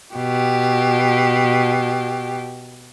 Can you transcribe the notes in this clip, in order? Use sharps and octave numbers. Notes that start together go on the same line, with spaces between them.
B2 G4